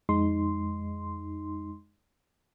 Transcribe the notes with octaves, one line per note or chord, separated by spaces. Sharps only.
F2 G#3 D#4 C6